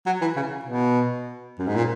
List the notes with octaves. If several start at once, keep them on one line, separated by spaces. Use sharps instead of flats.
F#3
E3
C#3
B2
F#2
G#2
A#2